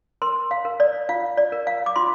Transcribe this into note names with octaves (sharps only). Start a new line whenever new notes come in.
A#4 C6
F5
A#4
D5
F4 F5
D5
A#4
F5
D6
F4 C6